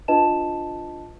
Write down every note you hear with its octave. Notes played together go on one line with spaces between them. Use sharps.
D4 F4 B4 D#5 A5 E7